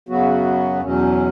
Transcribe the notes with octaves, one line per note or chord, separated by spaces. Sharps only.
F#2 C#3 F#3 B3 F#4
E2 B2 F#3 C#4